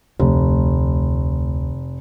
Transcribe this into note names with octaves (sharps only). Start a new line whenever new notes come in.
F1 D2